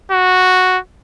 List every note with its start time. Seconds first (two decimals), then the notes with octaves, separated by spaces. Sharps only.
0.12 F#4